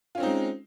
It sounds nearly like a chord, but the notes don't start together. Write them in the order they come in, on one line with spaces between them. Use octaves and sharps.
F4 C#4 C4 D#4 G#3